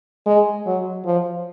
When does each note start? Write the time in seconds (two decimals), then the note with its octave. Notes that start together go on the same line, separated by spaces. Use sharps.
0.26 G#3
0.66 F#3
1.05 F3